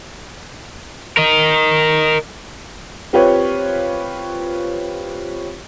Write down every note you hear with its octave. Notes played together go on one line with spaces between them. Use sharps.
A#4 D#5
C4 F4 G4 B4 C#5